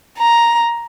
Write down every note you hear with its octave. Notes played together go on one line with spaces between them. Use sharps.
A#5